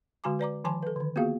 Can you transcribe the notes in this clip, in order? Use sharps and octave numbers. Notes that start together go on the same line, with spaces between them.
D3 G#3 F#4 G#5 A#5 D6
B4 D5 A#5 D6
D#3 F3 G#5 A5 C6 D6
A4 B4
D3 D#3
A#3 B3 F4 F#4 G#4 F5